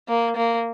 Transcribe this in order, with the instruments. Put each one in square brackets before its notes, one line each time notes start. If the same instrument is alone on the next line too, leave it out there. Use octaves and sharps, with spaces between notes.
[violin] A#3
A#3